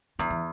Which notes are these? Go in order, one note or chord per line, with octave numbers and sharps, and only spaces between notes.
E2 E3
E3